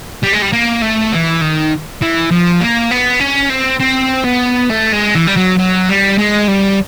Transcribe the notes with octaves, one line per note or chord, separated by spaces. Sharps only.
G3
G#3
G3
A#3
A3
E3
D#3
E3
F3
A#3
B3
C#4
C4
C4
B3
A3
G#3
E3
G3
F#3
F#3
G3
G#3
G3